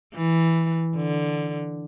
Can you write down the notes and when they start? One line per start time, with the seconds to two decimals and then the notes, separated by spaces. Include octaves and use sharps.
0.14 E3
0.97 D3